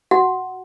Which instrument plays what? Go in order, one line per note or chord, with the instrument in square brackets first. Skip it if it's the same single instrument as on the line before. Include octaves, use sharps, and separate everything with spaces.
[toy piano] F#4 F#5